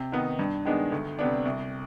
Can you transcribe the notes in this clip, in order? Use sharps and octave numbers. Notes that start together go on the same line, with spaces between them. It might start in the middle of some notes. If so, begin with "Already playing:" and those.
Already playing: C3
D#3 B3 D#4
G2
D#3 G#3 B3 D4
D2
C3 G3 B3 D4
C2